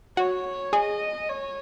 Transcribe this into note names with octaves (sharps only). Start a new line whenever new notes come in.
F#4 C#5
G#4 D#5
C#5